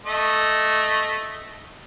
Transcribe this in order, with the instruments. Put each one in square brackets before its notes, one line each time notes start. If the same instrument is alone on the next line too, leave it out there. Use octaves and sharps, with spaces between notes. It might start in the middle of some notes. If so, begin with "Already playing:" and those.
[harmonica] A3 D#5